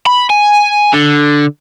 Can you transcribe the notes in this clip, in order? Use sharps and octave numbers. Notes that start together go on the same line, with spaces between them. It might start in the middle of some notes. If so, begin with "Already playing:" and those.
B5
G#5
D3